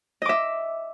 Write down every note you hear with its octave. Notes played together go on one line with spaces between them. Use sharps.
D#5 E5 D6